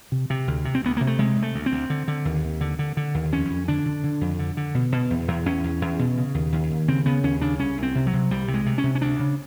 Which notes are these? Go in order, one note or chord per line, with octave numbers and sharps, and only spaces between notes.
C3
C3
D2
C3
C4
D2 B3
C3 A#3
A3
C3 G#3
C3
A3
D2
C4
D2
D3
D3
D#2
D#2
D3
D3
D3
D#2
F2 C#4
F2
D3 D4
D3
D3
F2
D3
D3
B2
B2
E2
E2
E2 C#4
E2
E2
B2
C#3
D#2
D#2
D#2
C#3 C4
C#3 B3
D#2 C#4
C#3 D4
C2 C#4
C2
C4
C3
F#3
C3
C2 G3
C3
G#3
C3
C#4
C3
C#4
D2 D4
C#3